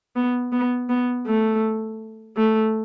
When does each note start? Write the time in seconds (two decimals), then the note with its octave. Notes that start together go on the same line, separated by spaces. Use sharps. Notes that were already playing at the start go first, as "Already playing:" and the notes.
0.16 B3
0.52 B3
0.89 B3
1.27 A3
2.37 A3